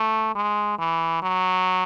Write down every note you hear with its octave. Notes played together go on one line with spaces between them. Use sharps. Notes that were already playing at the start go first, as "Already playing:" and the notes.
Already playing: A3
G#3
E3
F#3